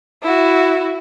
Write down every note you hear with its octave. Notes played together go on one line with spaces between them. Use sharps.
E4 F#4